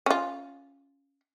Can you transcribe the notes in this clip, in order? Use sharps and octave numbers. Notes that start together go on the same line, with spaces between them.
C#4 F4